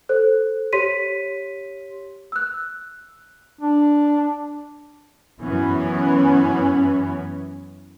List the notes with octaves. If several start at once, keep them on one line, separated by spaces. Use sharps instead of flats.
A4 C5 F#6
G4 C#5 C6 B6 D#7
E6 F#6
D4
F#2 E3 B3 C#4